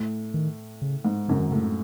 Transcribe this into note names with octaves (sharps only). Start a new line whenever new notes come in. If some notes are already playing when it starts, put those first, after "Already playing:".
Already playing: A2
D#3
C#3
G#2
F#2 C#3
D#3
A2 C#3